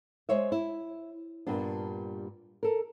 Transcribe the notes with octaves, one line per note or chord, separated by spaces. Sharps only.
G#3 C5 C#5 E5
E4
G2 A#2 G3 B3 D4
A4 A#4